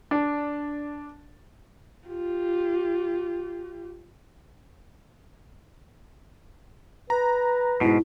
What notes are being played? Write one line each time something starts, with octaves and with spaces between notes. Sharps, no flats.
D4
F4 G4
B4 A#5
G#2 B2 E4